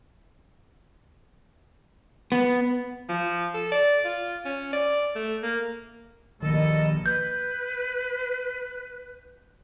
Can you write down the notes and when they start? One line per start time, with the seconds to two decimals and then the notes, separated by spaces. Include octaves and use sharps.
2.32 B3
3.09 F3
3.54 A4
3.72 D5
4.05 F4
4.46 C#4
4.73 D5
5.16 A3
5.43 A#3
6.43 A#1 D#2 D#3 A4 D#5
7.06 B4 G6